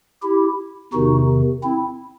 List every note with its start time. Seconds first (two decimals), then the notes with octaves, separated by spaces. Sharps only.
0.22 E4 G4
0.93 E2 C3 D#3 D#4 F#4
1.63 C4 E4